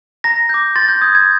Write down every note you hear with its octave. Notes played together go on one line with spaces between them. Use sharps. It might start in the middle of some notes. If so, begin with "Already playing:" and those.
A#5 A#6
D6 G6
C6 A6
G6
D#6 G6 G#6
G#6